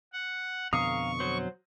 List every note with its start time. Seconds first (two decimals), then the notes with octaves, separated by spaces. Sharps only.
0.13 F#5
0.73 F2 B2 D3 F5 A#5 C#6 D#6
1.20 F#3 C5